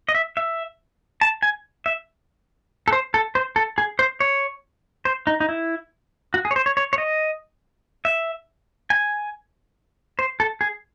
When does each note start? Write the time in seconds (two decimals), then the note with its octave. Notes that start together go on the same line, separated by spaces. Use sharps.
0.09 D#5
0.15 E5
0.37 E5
1.21 A5
1.42 G#5
1.86 E5
2.88 A4
2.92 C5
3.14 A4
3.35 C5
3.56 A4
3.78 G#4
3.99 C5
4.20 C#5
5.05 C5
5.27 D#4
5.40 D#4
5.49 E4
6.34 F#4
6.45 G#4
6.51 C#5
6.56 C5
6.66 C#5
6.77 C#5
6.93 C#5
6.98 D#5
8.05 E5
8.90 G#5
10.19 C5
10.40 A4
10.61 G#4